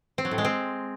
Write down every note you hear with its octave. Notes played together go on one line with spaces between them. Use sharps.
C4
F#3
A2
G#3
C4